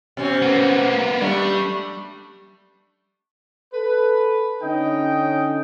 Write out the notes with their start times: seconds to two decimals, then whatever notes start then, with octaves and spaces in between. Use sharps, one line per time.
0.17 B2 C4 C#4
0.42 A#3 B3
1.21 G3 A3 D4
3.73 A4 B4
4.61 D3 C#4 D#4 D#5 G5